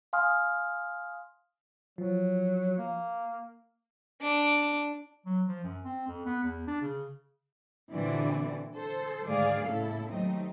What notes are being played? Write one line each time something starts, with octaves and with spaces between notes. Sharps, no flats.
F5 G#5 C6 D#6 F6
F3 F#3
A#3
D4 D6
F#3
F3
F#2
C4
F2
B3
E2
D4
C#3
A#2 D3 E3 C4 F#4 D5
A4 C5
D2 G#2 D#3 G#4 D5 F5
A2 C#3 A#3 E4 A4
D#2 F#3 A3 C4 D#4